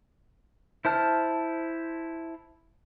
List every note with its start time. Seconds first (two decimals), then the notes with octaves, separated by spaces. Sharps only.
0.85 E4 C5 A5 F6